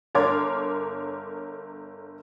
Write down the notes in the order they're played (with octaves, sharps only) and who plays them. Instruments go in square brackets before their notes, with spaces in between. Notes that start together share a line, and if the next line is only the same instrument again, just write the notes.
[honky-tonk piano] G1 A#4 C#5 C6 D6 G#6